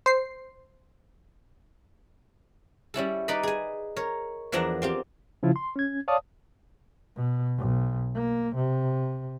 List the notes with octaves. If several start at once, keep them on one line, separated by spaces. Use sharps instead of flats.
C5 C7
G3 C#4 E4 A4
D#4 B4 D5 D#5 B5
G#4 G#5
A#4 C#5
E2 E3 F3 D4 A#4 A#5
C4 F4 G4
C#3 F3 E4 F4
C6
C#4 G#6
C#5 D5 F5 A5 D#6
B2
B1
A#3
C3